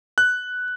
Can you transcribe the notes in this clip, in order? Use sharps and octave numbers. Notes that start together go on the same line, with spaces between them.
F#6